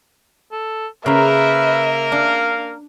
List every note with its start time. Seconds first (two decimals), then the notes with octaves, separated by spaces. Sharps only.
0.52 A4
1.06 C#3 A#3 A#4 B4 E5 A#5
2.12 D4 F5